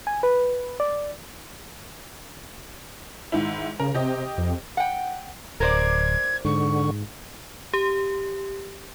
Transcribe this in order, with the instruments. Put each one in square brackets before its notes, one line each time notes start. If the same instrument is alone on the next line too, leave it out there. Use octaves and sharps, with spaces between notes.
[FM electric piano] G#5
B4
D5
[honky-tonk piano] G#2 D#3 E4
[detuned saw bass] C#3 [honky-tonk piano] A#4
[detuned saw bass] C3 [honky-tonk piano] G4 D#5
[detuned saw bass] F2
[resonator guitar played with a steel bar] F#5 G5
[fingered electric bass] D1 [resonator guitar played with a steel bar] A#4 C5 D5 [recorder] G#6
[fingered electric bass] G#2 [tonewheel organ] D3 [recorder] C#6
[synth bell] G4